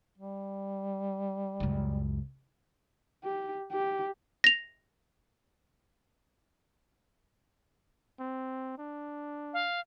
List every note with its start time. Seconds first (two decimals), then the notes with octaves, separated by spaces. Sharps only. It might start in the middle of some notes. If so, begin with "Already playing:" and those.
0.18 G3
1.60 C#2 F#2
3.24 G4
3.72 G4
4.44 A#6 F7
8.19 C4
8.78 D4
9.53 F5